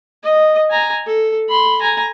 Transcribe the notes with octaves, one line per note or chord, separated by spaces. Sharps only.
D#5
G#5 A#5
A4
B5 C6
G#5 A#5